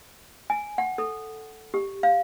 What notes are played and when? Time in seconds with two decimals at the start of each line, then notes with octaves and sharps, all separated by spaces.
0.50 G#5
0.78 F#5
0.98 A4
1.74 G4
2.03 F5